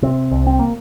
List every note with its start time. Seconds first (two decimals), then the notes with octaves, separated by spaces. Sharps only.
0.02 C3 C4
0.31 C2
0.47 C4
0.59 A#3